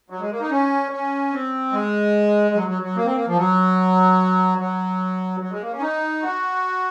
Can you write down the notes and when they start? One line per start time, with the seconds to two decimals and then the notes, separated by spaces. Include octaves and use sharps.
0.10 F#3
0.20 G#3
0.30 A#3
0.40 D#4
0.50 C#4
0.92 C#4
1.32 C4
1.72 G#3
2.55 F#3
2.68 F#3
2.82 F#3
2.96 A#3
3.05 C4
3.15 A#3
3.27 F3
3.36 F#3
4.59 F#3
5.40 F#3
5.51 G#3
5.61 A#3
5.72 C#4
5.81 D#4
6.22 F#4